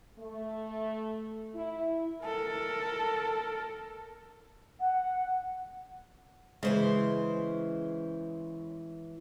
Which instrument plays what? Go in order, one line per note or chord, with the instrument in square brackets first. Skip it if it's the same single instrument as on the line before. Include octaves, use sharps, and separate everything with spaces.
[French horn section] A3
E4
[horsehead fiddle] A4 A#4
[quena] F#5
[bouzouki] C#3 C5 [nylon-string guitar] E3 G#3